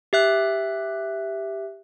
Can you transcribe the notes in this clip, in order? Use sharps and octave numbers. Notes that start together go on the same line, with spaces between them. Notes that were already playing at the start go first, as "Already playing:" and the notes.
G4 E5 F#6